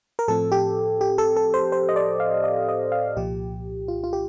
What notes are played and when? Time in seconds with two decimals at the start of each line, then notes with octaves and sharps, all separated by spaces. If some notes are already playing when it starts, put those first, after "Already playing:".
0.19 A#4
0.28 A2 F3 C4 A4
0.52 G4
1.01 G4
1.18 A4
1.36 A4
1.54 C5
1.72 C5
1.89 D#5
1.96 D5
2.20 F5
2.44 D#5
2.69 D#5
2.92 F5
3.16 C2 A#2 F3 G4
3.88 F4
4.04 F4
4.13 G4